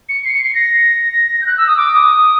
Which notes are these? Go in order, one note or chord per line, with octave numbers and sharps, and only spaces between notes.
C#7
C7
C#7
C7
A#6
G6
F#6
E6
D#6
D6
D#6